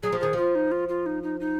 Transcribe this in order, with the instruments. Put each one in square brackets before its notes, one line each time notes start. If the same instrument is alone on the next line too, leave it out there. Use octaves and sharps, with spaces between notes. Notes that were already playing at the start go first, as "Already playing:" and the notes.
[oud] F#3 [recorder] G#4
[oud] F3
[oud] D#3 [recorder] G#4
[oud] F3 [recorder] F4
[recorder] D#4
F4
F4
D#4
D#4
D#4